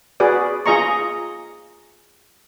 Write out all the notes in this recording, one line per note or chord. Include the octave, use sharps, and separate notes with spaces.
F#4 G#4 B4 D5
F4 G#4 D#5 A#5 C#6